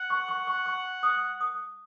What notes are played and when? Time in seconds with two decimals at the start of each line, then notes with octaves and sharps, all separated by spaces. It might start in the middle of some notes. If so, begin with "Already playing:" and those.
Already playing: F#5
0.10 C#6
0.28 C#6
0.47 C#6
0.66 C#6
1.03 D#6
1.41 D#6